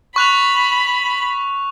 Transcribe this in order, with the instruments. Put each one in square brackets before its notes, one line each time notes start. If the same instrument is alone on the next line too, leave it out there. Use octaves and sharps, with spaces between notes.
[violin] B5 [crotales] C#6 F#6 F7